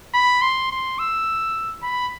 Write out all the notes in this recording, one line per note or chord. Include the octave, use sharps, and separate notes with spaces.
B5
C6
C6
E6
B5